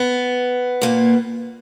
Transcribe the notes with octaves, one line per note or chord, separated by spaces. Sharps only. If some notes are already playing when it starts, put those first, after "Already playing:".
Already playing: B3
A#2 A#3